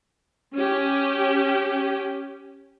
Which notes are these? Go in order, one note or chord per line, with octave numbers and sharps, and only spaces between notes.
C#4 G4